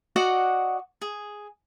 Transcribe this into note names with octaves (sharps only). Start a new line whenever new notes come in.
F#4 D5 D#5 F#5
G#4